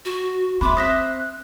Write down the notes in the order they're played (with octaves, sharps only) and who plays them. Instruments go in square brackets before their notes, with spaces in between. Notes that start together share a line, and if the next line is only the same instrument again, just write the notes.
[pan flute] F#4
[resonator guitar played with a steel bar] G#3 B3 E5 [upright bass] C4 [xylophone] B5 C6 [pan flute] D6
[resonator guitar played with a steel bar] C5 E5 [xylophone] D#6 A#6 B6 [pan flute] F#6